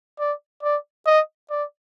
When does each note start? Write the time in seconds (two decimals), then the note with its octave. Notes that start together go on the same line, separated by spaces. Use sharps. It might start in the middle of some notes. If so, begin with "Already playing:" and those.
0.19 D5
0.63 D5
1.07 D#5
1.50 D5